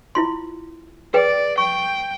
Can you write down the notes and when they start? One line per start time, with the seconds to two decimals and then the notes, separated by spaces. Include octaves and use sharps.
0.15 E4 F4 C6
1.14 G#4 B4 D5 G5
1.58 G5 C#6